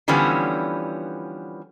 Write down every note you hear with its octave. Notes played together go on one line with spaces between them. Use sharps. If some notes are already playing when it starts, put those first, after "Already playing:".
D3 E3 F3 G3 B3 C#4